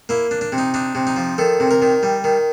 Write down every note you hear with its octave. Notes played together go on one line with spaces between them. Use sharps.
A#3 E4
D4
D4
C3
D#4
D4 D#4
C3
D#4
F3
D#3 A4
C3
A#4
D#3
G3
D#3